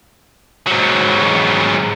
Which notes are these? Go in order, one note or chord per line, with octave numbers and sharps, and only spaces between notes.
G#2 F#3